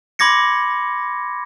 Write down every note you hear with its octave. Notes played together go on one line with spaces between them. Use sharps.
B5 C6 D6 G#6 A#6 C#7